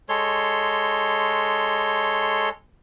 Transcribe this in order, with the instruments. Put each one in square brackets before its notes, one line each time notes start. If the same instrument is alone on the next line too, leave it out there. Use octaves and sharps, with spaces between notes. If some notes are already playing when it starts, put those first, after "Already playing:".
[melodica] G#3 A4 C#5 C6